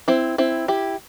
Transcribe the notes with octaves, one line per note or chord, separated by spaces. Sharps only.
C4 E4
C4 E4
E4 G4